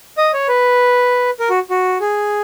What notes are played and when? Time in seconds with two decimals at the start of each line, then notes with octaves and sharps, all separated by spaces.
0.18 D#5
0.34 C#5
0.48 B4
1.40 A#4
1.50 F#4
1.70 F#4
2.01 G#4